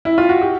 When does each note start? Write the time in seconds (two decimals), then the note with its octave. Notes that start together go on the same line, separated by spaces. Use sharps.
0.05 E4
0.18 F4
0.29 F#4
0.41 G4